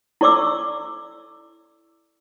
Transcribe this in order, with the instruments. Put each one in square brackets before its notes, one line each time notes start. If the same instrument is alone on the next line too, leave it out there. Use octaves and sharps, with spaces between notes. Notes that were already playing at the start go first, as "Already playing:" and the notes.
[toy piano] E4 A4 D5 C#6 D6 E6